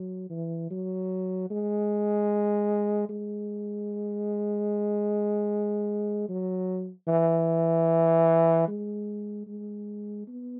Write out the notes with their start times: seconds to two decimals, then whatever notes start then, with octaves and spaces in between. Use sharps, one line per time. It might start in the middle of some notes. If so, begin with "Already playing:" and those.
Already playing: F#3
0.30 E3
0.70 F#3
1.50 G#3
3.09 G#3
6.29 F#3
7.07 E3
8.68 G#3
9.47 G#3
10.27 B3